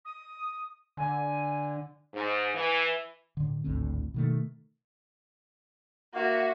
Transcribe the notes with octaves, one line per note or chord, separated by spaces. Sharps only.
D#6
D3 G#5
G#2
E3
A2 D3
G#1 D2 A2 C4
B2 D#3 A3
A#3 F#4 E5